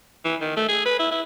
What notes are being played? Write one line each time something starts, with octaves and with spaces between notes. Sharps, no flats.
E3
D#3
A3
G#4
B4
E4
E4